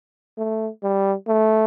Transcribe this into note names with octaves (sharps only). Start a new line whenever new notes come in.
A3
G3
A3